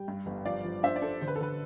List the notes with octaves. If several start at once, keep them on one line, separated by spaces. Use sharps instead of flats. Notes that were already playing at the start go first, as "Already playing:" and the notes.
Already playing: G3 G5
G2
G1
F3 D5 F5
F3
D4 C5 E5
D5
D4 A4 C5
D3 C5
B4
A4
D3 B4